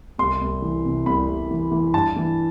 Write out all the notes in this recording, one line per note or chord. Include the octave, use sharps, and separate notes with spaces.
C2 C6
C2
E3
C3
C2 B5
C2
E3
E3
G2 A5
E3